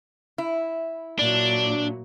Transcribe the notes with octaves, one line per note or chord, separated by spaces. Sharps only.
E4
A#2 F#3 D4